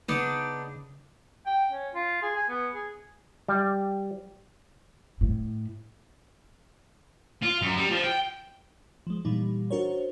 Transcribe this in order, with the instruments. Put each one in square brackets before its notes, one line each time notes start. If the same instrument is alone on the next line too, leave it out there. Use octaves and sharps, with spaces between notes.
[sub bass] C#3 [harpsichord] B3 [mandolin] D4 D#4
[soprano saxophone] G5
C#4
F4
G#4
G#5
B3
G#4
[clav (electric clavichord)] G3
[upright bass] A2
[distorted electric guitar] F4
F#2
G3
F3
G5
[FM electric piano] F3 G#3
A#2 E3 G3 D#4
D4 F#4 A#4 C5 C#5